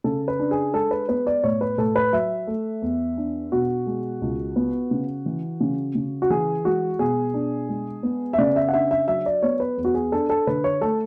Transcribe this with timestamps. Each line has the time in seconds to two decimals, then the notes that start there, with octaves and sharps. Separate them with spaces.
0.04 C#3 A4
0.28 B4
0.39 D4
0.51 G#4
0.74 G#3 A4
0.91 B4
1.09 B3 B4
1.27 D5
1.44 A2 C#5
1.61 B4
1.78 A2 A4
1.96 B4
2.13 F#3 E5
2.47 A3
2.82 E2
3.17 D4
3.52 B2 F#4
3.87 G#3
4.22 C#2
4.56 B3
4.91 C#3
5.26 E3
5.61 C#3
5.95 C#3
6.22 F#4
6.30 E3 G#4
6.65 G#3 F#4
6.99 B2 G#4
7.34 D4
7.69 G#3
8.03 B3
8.33 E5
8.38 C#3 D5
8.56 E5
8.69 F#5
8.73 D4 E5
8.91 E5
9.08 F#3 E5
9.26 D5
9.43 B3 C#5
9.60 B4
9.78 E2
9.85 F#4
9.94 G#4
10.12 D4 A4
10.30 A4
10.47 D3 B4
10.64 C#5
10.81 A3 A4